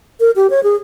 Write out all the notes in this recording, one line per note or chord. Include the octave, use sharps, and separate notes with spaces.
A#4
G4
C#5
G#4